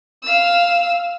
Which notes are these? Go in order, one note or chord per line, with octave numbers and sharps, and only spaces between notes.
F5 E6